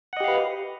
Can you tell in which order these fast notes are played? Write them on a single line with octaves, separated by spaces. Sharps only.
F#5 D#5 G4 F5 B4